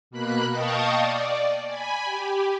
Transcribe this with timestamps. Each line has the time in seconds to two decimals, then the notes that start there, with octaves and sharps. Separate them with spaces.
0.11 B2 A#3 B5 F#6
0.51 D#5 F5 G5 A5 C#6 D#6
0.96 D5
1.67 G#5 B5
2.05 G4